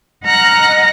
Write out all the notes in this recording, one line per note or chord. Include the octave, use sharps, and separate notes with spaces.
D#5 F#5 A#5 F6 F#6 A#6